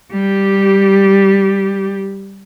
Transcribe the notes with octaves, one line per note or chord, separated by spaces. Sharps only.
G3 G4